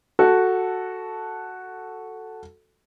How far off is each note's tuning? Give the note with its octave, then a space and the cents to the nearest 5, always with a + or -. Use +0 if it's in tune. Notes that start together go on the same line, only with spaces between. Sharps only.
F#4 +0 A4 +0